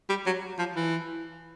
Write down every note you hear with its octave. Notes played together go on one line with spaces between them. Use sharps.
G3
F#3
F3
E3